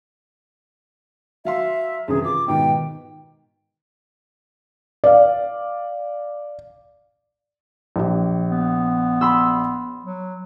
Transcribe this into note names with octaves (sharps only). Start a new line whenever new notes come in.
F#3 E5 F5 C6
F#2 C3 E3 G#4
F4 D6
G#2 B2 D#3 G5
D5 F5
A#1 G4
B3
B5 C6 E6
F#3